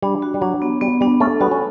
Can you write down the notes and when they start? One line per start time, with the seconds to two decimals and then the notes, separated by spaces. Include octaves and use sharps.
0.02 G3 D4
0.22 F#4
0.34 G3
0.41 F#3 D4
0.62 B3
0.81 G3 B3
1.01 G3 D4
1.20 A3 C#4 A4
1.41 G3 B3 F#4
1.51 C#4